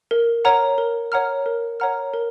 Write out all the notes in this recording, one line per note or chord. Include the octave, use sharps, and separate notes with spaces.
A#4
C#5 F#5 A#5 F6
A#4
C#5 F#5 A#5 F6
A#4
C#5 F#5 A#5 F6
A#4